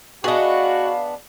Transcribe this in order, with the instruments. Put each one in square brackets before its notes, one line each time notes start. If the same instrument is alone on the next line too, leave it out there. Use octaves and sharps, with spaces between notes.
[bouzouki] B3 D4 [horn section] F#4 [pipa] G#4 D#5 [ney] F5